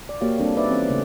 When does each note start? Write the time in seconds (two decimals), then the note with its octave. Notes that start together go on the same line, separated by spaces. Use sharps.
0.09 D5
0.21 A#3 F#4 G4 C#5 F5
0.38 G3 C4 D4 E4 A4 D5
0.55 D4 D#4 B4 D5 E5
0.70 E3 C4 C#4
0.89 C#3 A3